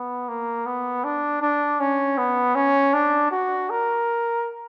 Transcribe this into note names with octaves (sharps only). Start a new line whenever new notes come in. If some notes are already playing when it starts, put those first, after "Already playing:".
Already playing: B3
A#3
B3
D4
D4
C#4
B3
C#4
D4
F#4
A#4